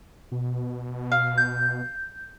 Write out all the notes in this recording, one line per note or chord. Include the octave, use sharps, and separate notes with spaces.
B2
F5
G6